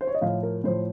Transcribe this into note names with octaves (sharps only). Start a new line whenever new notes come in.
C5
C#5
D#5
A2 F3 F5
A#4
A2 F3 C5